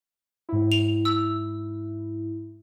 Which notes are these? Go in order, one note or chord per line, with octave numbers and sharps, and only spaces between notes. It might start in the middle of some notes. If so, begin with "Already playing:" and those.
G#2 E4
F7
E6